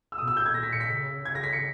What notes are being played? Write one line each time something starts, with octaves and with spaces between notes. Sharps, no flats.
E6
B2 D#6
E6
G6
G#6
A#2 A#6
B6
C#7
B6
C#3
C#3 G#6
A#6
B6
C#7